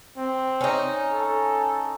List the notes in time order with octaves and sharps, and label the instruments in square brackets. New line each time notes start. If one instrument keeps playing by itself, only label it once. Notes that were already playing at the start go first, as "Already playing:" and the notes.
[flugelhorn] C4
[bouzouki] C#4 D#4
[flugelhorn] A4